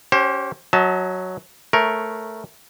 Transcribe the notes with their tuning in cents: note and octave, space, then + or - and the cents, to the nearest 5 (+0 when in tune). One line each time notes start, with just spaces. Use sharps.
C#4 +0 G4 -30 C5 +30
F#3 +0 D#5 +40 A5 +0
A3 +0 A#4 +10 C#5 +0